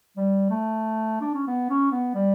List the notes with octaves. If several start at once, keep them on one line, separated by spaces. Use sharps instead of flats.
G3
A3
D4
C#4
B3
C#4
B3
G3